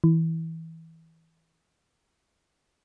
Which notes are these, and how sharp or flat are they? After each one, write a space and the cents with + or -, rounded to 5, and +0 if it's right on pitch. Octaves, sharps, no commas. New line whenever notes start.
E3 -20